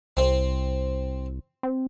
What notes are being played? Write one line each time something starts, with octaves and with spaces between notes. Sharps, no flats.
C2 C4
C4